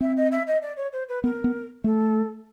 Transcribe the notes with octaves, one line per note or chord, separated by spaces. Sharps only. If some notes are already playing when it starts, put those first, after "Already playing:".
C4 E5
D#5
E5
D#5
D5
C#5
C5
B4
B3 A#4
B3
A3 A4